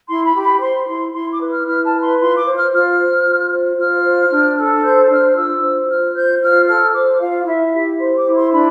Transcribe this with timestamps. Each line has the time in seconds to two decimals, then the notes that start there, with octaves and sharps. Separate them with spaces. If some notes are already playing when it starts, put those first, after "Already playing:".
0.08 E4 C6
0.26 B5
0.35 G4
0.43 B5
0.61 C5 C6
0.87 E4 C6
1.14 E4 C6
1.31 D6
1.40 B4
1.49 F6
1.66 E4 F6
1.84 A5
1.93 B4
2.01 C6
2.19 F4 C6
2.37 D6
2.45 C5
2.54 F6
2.72 F4 F6
2.98 C5
3.24 F4
3.51 C5
3.78 F4 F6
4.04 C5
4.30 D4
4.56 A4
4.83 C5 G6
5.09 D4 F6
5.35 F4 E6
5.62 C5
5.88 F4 F6
6.14 C5 G6
6.41 F4 F6
6.68 A4 F6
6.94 C5 D6
7.20 F4 F5
7.46 E4 E5
7.73 G4
7.99 C5 C6
8.16 D6
8.26 E4
8.34 C6
8.52 D4 B5